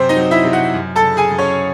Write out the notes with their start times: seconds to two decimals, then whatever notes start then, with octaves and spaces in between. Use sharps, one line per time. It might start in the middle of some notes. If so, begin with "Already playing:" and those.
Already playing: F#2 C3 C4 C5
0.09 D#4 D#5
0.17 F#3
0.31 E4 E5
0.45 C3
0.53 F#4 F#5
0.74 F#2
0.96 A4 A5
1.03 C#3
1.17 G#4 G#5
1.31 F#2
1.38 C#4 C#5